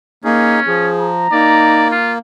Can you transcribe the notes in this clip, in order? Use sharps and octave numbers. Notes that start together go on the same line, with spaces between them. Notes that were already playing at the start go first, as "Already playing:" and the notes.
A#3 C#4 D#4 G#4
F3 G#4
A#5
A#3 D#4 D5
F4